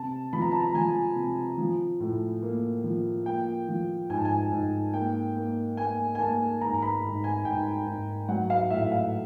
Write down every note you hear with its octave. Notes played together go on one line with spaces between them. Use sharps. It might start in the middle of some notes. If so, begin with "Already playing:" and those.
Already playing: C3 A5
F3 B5
A#5
A5
A#5
F3 G#5
C3
F3
A2
A#3
F3
A#3 G5
F3
G#2 G#5
A5
G#5
G#2
A#3 G5
A#3
A#3 G#5
G#5
A#3 A5
G#2 A#5
A#5
B5
G#2
G#5
G#2 G5
G#2
F#3 F#5
F5
A2 E5
F5